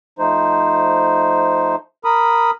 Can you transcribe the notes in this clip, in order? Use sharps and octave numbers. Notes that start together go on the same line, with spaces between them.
F3 A3 D#4 C5
A#4 B5 D#6